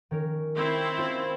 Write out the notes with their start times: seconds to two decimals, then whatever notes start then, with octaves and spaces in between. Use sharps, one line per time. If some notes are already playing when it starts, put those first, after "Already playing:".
0.11 D#3 C#4 A#4
0.55 C4 E4 C#6 G6
0.97 C#4 F4 C5